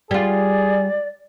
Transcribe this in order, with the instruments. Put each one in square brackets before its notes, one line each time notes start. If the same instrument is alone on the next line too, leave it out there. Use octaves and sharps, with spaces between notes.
[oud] G3 F4 [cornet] G#4 [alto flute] D5